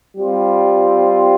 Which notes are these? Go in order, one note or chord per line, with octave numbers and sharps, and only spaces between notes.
G3 C4 F4